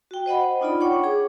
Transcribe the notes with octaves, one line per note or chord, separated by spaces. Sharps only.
F#4 G5
C5 D#5 F#5 B5
D4 D#4 F4 D5 B5
C#5 F#5 G5 C#6 D6
G#4 D6